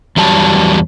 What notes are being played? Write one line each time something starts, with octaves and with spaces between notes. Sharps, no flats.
E2 F#3 G3 A5